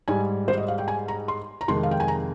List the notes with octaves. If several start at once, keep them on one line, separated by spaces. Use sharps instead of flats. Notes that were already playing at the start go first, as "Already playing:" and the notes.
G#2 G3 G#5
C5
D#5
F5
G5
G#5
A#5
C6
A#5
F2 C3 D#3 G#3 C6
F5
G5
G#5
A#5